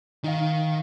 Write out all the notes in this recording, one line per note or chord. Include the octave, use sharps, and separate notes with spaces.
D#3 D#4 D#5 F5